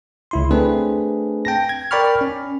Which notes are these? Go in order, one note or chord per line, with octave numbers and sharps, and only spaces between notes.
C#2 E4 C6
A3 C4 D4 G#4 B4
G5 A5 A#6
G#6
A#4 D5 G5 B5 C#6 F6
C#4